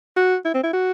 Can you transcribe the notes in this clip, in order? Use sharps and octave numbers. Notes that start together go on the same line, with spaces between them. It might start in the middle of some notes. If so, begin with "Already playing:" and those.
F#4
E4
C4
E4
F#4